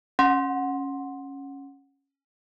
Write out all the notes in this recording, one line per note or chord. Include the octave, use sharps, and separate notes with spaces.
C#4 F#5 C6